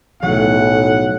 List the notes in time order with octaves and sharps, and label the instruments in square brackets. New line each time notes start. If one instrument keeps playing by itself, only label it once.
[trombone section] B1 A2 [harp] F#3 [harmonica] F#5